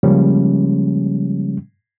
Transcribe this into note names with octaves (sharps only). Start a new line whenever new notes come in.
C#3 F3 G3 G#3 A#3 C#4